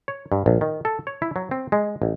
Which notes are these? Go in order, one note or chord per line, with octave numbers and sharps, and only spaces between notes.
C#5
G2
A#1
D#3
A4
C#5
E4
F#3
C4
G#3
A1